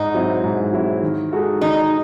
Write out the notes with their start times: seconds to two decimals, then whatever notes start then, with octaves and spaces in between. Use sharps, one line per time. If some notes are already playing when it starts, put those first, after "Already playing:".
Already playing: G#2 D#4
0.15 F#3 C4 E4
0.44 G#2
0.73 F#3 C4 E4
1.03 D#3
1.32 G#3 D#4 F#4 A4
1.61 D#3 D#4